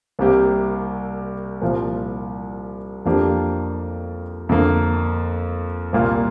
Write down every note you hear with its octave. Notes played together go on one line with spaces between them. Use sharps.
C2 C3 A#3 G4
C2 A#2 F3
F2 F3 A#3 D4 G4
F2 D3 A#3
C2 A#2 A#3 F4